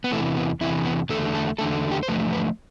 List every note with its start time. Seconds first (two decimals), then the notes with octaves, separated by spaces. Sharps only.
0.04 B3
0.11 E2 C3 E3 A3
0.36 B3
0.61 E2 C3 E3 E4
0.85 B3
1.09 E2 D3 A3 A4
1.35 A4
1.58 E2 D3 A3 A4
1.91 G4
2.03 C5
2.08 E2 D3 F3 A3 B4
2.33 B4